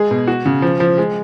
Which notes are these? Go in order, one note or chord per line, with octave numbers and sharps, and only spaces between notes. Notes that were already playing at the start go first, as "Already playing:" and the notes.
Already playing: G#3 G#4
B2
F#4
C#3
F3
F3
G#3